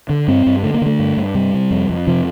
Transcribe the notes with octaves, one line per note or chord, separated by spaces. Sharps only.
D3
G2 C4
G2
D3 A3
A#3
D3 A3
G2
G2
C3 G3
C3
F2
F2
C3 F3